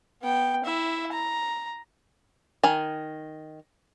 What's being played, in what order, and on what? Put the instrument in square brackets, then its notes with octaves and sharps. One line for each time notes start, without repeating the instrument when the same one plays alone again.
[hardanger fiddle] B3 G5
E4 E5
A#5
[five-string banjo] D#3 G#5